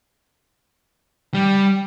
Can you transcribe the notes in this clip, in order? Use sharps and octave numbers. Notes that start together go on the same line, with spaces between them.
G3